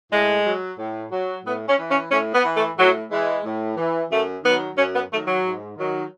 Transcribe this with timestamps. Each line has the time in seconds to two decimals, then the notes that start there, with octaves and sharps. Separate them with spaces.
0.12 A2 G#3
0.46 F#3
0.79 A2
1.12 F#3
1.45 A2 B3
1.68 C#4
1.79 E3
1.90 C#4
2.11 A2 C#4
2.34 B3
2.44 E3
2.55 A3
2.77 A2 F#3
3.11 E3 G#3
3.45 A2
3.77 E3
4.11 F#2 A3
4.44 D#3 F#3 B3
4.77 F#2 C#4
4.94 B3
5.11 D#3 A3
5.14 F#3
5.27 F#3
5.44 G#2
5.77 D#3 F#3